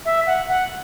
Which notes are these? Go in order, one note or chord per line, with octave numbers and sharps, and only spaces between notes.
E5
F#5
F#5